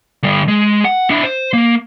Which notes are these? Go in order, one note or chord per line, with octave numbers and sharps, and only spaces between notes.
D3 G3
G#3
F#5
D4 E4
C5
A#3